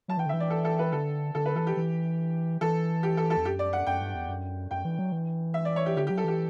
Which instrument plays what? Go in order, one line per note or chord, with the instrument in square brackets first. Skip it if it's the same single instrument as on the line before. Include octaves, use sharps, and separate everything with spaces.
[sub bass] F#3 [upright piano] A5
[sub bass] E3 [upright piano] G5
[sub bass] D3
[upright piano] E5
[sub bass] E3
[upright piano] D5
A4
A4
B4
[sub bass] D3 [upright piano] A4
[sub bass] D3 [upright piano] A4
[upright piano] B4
[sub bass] E3 [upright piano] A4
[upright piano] G4
[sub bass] E3
[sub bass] E3 [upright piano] A4
[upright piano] G4
A4
A4
[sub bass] E2
[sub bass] F#2 [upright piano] G4
[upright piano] D5
F#5
[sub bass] F#2 [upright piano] G5
[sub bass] G2
E2
F#2
[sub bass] F#2 [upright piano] G5
[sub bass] E3
F#3
E3
[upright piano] E5
D5
C#5
G4
[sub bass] D3 [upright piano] G4
[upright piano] G4
[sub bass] F#3
[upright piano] A4
[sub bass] E3 [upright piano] G4